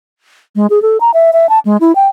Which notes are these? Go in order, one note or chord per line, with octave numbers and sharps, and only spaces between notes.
G#3
G#4
A4
A#5
E5
E5
A5
G#3
E4
G5